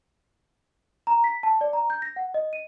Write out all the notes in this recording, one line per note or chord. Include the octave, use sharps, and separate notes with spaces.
A#5
B6
A5
D5
A#5
G6
A#6
F#5
D#5
D#7